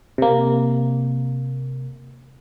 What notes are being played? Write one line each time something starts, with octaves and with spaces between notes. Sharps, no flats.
C3 A#3